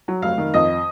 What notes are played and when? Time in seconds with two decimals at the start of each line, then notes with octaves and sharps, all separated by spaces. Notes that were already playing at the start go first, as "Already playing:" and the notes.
0.08 F#3
0.22 F1 F5
0.38 D#3
0.54 F2 D#5